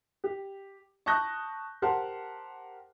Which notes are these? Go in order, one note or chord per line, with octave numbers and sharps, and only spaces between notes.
G4
A5 C#6 D#6 F#6 G6 A#6
G4 A#4 C5 F#5 A5 C6